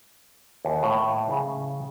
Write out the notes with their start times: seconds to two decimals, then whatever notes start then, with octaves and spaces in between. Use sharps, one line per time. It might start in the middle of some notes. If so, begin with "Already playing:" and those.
0.65 D#2
0.83 A2
1.29 C#3